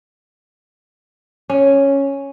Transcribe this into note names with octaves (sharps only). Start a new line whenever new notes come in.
C#4